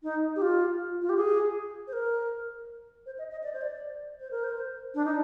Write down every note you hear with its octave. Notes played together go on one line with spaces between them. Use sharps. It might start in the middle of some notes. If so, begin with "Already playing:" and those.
D#4
G4
F4
F4
G4
G#4
C5
A#4
C5
D#5
D#5
D5
C5
D5
C5
A#4
C5
D4
D#4